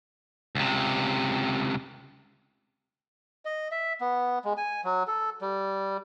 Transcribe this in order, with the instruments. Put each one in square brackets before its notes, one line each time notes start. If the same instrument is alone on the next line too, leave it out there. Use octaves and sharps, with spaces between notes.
[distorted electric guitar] C#2 C3
[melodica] D#5
E5
B3
G#3
G#5
F#3
A4
G3